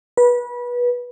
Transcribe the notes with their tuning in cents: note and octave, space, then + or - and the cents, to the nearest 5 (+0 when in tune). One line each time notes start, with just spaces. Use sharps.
B4 -25